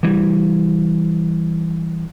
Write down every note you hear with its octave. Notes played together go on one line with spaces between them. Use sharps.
E3 G3